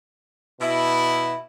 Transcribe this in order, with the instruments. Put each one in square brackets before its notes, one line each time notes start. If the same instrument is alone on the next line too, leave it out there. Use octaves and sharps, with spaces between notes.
[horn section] B2 E4